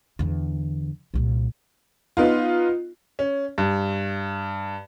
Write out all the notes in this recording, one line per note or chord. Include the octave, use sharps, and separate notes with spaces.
E2 D3
C2 A#2
B3 D#4 F4
C#4
G2